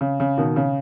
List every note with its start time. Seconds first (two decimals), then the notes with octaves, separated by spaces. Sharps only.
0.01 C#3
0.20 C#3
0.38 B2 D#3
0.56 C#3